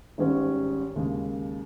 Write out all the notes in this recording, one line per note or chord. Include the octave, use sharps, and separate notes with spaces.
G#1 G#2 G3 C#4
D#2 C#3 G#3